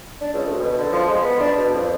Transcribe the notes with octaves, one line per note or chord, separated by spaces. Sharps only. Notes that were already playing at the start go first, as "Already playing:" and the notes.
D4
C#2
D2
B2
D3
F3
G#3
B3
D4
B2
F2